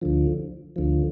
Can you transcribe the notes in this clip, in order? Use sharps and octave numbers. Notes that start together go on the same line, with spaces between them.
D2 D3 F3
D2 D3 F3